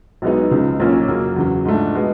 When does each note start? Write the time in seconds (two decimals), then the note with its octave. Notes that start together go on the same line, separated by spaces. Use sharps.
0.22 B1 B2 G#3 B3 D#4
0.51 C#2 C#3 F3
0.80 B1 A#2 F3 A#3 C#4
1.08 F#2 C#3 F#3 A#3
1.36 E2 C#3 F#3
1.65 G#2 F3 A3 D4
1.94 B2 G#3 B3